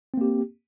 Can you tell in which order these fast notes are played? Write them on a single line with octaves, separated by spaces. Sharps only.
C4 A#3 G4